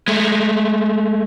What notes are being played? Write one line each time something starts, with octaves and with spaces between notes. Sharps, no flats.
G#3 A3